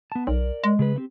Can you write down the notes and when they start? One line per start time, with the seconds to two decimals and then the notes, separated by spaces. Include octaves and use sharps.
0.12 B3 A5
0.27 B1 A#4 D5
0.64 G#3
0.79 C#3 G#4 B4
0.96 A3 C4 G4